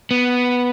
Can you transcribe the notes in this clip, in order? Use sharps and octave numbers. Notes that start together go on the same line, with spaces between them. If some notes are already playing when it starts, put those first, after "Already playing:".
B3